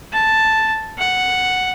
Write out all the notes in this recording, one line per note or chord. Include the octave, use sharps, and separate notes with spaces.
A5
F#5